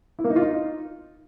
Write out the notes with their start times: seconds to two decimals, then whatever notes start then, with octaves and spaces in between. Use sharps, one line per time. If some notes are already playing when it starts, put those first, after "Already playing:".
0.19 E4
0.24 A#3
0.30 D#4
0.36 F4
0.42 D#4